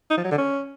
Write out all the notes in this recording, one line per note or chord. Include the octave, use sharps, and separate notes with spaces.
D#4
F3
F#3
D3
C#4